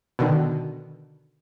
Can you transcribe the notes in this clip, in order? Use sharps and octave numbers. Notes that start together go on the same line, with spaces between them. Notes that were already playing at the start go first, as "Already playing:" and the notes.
B2 D3 D#3